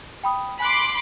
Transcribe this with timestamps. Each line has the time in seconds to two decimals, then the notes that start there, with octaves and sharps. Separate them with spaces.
0.24 G5 B5 D#6
0.60 G#5 B5 C6 D6 F#6